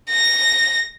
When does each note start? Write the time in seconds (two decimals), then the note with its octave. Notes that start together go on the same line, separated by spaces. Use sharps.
0.11 A#6